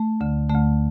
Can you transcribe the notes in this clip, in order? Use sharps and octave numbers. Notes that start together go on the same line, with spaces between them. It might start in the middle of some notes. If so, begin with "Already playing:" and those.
Already playing: A3
D2 D3
D2 D3 A3